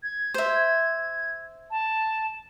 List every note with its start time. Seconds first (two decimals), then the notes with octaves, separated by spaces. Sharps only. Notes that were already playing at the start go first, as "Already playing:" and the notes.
0.03 G#6
0.34 C5 E5
1.71 A5